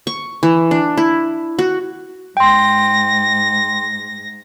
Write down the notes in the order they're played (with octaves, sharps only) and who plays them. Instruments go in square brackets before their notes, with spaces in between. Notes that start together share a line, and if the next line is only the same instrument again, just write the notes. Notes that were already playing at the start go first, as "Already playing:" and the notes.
[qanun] C#6
E3
D4
E4
F#4
[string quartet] G#2 A#6 [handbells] G5 C6